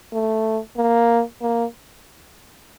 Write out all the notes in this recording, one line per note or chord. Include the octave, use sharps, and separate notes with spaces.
A3
A#3
A#3